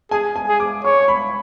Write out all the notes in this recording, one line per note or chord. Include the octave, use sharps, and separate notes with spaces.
G#4 G#5
G#5
G#4
D6
C#5 C#6
B5